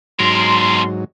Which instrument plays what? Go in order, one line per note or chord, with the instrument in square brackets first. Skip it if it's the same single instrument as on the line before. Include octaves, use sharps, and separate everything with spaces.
[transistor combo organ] G#2 F#3 [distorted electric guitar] B2 A#4 [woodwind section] C6